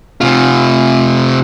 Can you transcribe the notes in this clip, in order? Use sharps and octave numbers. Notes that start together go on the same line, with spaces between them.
C3 F4